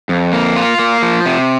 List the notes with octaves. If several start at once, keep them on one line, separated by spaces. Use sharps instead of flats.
F2
A#3
F4
A#3
F3
C3